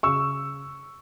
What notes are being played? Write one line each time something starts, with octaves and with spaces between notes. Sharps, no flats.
C#3 C#6 E6